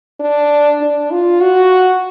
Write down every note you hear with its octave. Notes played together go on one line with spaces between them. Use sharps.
D4
D4
F4
F#4